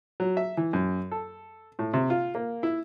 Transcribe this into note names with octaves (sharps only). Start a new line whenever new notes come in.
F#3
E5
E3
F#2
A4
A2
C3
F4
A#3
E4